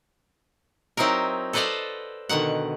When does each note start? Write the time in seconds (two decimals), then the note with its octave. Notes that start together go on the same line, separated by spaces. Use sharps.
0.97 F#3 C4 D#4 E4 A#4
1.53 A4 B4 C5 D5 D#5 F5
2.29 B2 D3 D#3 F#5